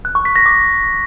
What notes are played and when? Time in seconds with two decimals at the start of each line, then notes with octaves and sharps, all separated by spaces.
0.05 F#6
0.15 C#6
0.25 B6
0.36 A#6
0.46 D6